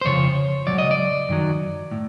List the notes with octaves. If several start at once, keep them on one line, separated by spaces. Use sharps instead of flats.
C5
F2 C#3 F3 C#5
C#2 B2 F#3 D5
D#5
D5
F#2 D#3 F#3
A2